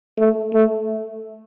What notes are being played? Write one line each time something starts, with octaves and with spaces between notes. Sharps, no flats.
A3
A3